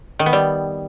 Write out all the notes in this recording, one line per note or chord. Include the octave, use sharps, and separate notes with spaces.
D#3
B3
G3